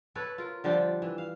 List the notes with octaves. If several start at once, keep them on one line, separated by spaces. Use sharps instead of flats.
A4 B4 C#5
F4 A#4
D3 F3 G3 G4
E3
F5